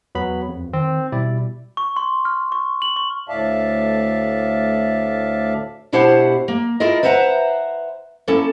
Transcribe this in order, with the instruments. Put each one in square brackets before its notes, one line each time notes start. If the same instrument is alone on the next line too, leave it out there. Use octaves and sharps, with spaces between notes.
[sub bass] E2 [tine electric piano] F#3 B3 B5
[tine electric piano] F2
[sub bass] D#3 [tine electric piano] C4
[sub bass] B2 [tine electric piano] G3 E4 D5
[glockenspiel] C#6
C6
F6
C#6
F#7
C#6
[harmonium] D2 A2 D5 E5 F5 A5
[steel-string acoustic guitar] B2 D4 E4 G4 C5 F#5
A#3
E4 F4 G#4 A#4 D#5
B4 C5 E5 F#5 A#5
A#3 C#4 E4 A4